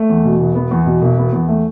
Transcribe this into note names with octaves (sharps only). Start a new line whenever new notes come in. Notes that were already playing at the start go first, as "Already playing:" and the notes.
Already playing: A3
E2
B2
E1
B3
E2
B2
E1
B3
E2
A3